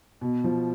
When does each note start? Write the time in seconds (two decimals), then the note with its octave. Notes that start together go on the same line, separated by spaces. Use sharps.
0.21 B2
0.44 F3